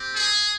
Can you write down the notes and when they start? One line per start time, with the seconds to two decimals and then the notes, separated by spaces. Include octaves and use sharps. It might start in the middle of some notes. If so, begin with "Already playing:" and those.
Already playing: C4 G4
0.14 G#4